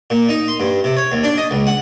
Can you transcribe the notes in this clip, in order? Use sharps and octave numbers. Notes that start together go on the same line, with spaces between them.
A#2
D#4
C6
G2
C3
C#5
D#2
D4
D#5
C#2
F#5